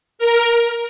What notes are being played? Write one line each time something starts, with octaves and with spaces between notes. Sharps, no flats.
A#4